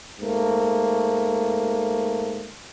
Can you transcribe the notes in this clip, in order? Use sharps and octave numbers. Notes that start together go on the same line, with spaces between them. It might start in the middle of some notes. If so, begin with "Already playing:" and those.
G#2 A3 A#3